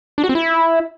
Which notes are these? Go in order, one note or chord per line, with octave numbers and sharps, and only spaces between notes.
D4
F#4
C4
E4